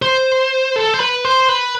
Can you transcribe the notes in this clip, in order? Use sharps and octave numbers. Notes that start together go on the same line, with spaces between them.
C5
A4
C5
B4
C5
B4